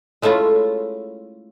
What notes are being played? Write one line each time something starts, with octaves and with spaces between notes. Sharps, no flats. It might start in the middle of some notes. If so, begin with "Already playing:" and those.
G#3 A3 C#4 E4 F4